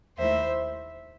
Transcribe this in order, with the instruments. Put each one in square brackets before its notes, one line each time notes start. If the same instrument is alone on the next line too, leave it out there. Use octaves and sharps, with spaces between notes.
[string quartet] D#2 D#3 A3 E4 C5 E5